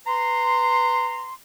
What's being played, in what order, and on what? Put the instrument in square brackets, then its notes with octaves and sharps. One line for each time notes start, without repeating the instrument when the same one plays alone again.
[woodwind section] B4 A#5 C6